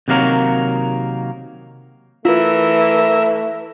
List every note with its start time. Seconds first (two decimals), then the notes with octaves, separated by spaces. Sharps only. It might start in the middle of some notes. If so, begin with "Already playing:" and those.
0.08 C3 D#3 F#3 A#3 A#4 C#5
2.25 E3 A3 F4 A#4 E5 E6